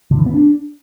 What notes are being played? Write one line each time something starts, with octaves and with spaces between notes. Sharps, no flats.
D3
E3
B3
D4